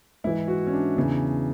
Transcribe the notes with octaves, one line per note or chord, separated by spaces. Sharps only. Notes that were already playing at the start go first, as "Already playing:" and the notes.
G#2 E3 E4
F#4
C#4
D4
E2 C#3 E3